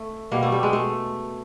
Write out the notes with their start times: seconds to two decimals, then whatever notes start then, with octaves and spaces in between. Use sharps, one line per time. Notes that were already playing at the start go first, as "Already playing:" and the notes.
Already playing: A3
0.31 B2 G3 A#3
0.43 A3
0.52 G3
0.63 G#3
0.73 A3